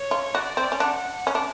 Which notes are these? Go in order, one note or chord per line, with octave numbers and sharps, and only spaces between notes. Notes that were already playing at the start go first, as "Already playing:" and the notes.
Already playing: C#5
F4
F#4 D5
C4
C#4
D4 F#5
C#4
D4